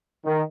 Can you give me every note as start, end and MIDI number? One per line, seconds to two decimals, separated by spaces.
0.25 0.42 51